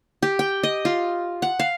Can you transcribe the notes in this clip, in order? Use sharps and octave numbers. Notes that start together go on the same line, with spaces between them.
G4
G5
D#5
F4
F#5
F5